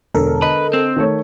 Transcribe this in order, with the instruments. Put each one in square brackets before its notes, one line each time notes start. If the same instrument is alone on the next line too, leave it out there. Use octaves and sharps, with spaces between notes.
[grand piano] E1 [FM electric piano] D3 A4 A#4
[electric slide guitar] B4 [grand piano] D#5
[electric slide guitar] C4
[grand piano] D#3 A3 C#5